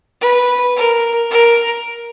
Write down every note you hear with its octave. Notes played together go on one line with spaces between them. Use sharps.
B4
A#4
A#4